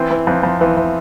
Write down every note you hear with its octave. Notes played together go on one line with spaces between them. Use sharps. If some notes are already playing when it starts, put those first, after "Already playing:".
Already playing: E3 C4
E3
F2
F2
E3
E3